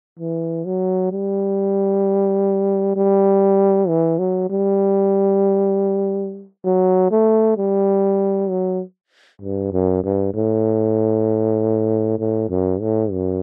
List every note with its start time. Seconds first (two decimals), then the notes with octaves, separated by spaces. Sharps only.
0.19 E3
0.65 F#3
1.11 G3
2.96 G3
3.88 E3
4.19 F#3
4.50 G3
6.65 F#3
7.11 A3
7.57 G3
8.50 F#3
9.42 G2
9.73 F#2
10.04 G2
10.34 A2
12.19 A2
12.50 F#2
12.81 A2
13.11 F#2